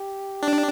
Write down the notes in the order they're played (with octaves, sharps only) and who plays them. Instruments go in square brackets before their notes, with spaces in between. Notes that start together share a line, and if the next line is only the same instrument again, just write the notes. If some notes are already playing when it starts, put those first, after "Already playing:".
Already playing: [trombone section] G4
[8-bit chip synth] D4